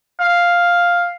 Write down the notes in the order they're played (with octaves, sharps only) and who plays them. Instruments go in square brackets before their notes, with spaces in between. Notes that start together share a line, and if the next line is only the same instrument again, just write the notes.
[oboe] F5